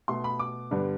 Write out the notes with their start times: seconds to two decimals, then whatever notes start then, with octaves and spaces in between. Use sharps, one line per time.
0.08 B2 A3 C6
0.24 B5
0.39 D6
0.71 G2 D3 G3 B3